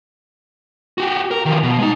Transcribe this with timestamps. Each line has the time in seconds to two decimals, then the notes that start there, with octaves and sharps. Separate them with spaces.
0.98 F#4 G4
1.31 A#4
1.45 D#3 F3
1.63 B2
1.79 G#3 D#4